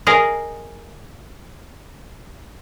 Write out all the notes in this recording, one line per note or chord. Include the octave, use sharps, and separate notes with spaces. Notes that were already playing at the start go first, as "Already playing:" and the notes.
G#4 A#4 D#5 F5